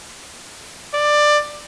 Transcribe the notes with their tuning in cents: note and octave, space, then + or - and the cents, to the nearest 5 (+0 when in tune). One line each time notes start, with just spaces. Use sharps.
D5 +15